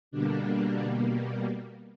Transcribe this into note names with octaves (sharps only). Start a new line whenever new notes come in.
B2 D3 G3 A#3 D4